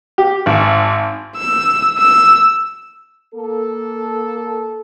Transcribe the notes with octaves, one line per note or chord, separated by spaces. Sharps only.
G4
G#1
E6
E6
A#3 A4